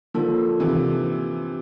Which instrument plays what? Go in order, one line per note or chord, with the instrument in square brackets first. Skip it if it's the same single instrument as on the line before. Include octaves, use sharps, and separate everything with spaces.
[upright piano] D3 F3 [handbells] A#3 D4 A4
[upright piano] C3 E3